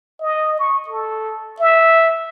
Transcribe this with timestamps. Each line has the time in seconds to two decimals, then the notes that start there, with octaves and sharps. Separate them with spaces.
0.21 D#5
0.59 C#6
0.88 A4
1.60 E5